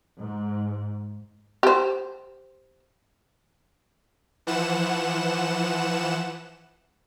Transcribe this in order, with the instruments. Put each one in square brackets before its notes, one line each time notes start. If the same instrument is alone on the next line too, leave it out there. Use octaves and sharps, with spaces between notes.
[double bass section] G#2
[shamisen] G4 C5
[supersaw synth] E3 F3 F#5 E7